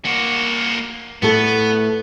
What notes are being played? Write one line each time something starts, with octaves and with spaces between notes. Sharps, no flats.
A#3 F#4
A2 A3 B3 A4